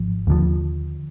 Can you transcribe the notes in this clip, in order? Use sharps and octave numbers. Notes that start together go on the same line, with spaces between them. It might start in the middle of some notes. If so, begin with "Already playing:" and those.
Already playing: G#1 F3
D#2 D3 F3